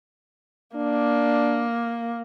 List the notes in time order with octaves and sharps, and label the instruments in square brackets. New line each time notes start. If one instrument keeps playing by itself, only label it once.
[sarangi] A#3 [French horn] D4